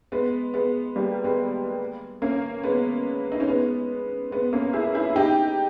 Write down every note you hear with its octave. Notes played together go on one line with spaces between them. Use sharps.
G#3 B3
G#3 B3
G3 A#3
G#3 B3
A#3 C#4
G#3 B3
D#4
C#4
G#3 B3
G#3 B3
A#3 C#4
E4 G#4
E4 G#4
E4
D#4 G4